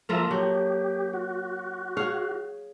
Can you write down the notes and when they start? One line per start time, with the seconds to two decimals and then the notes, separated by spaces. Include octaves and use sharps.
0.09 F3 A#3 F4 A4 E5 A#5
0.31 F#3 G4
1.13 F#4
1.97 G#4 C#5 F5